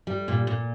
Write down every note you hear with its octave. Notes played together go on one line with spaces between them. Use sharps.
G3
A#2
A#2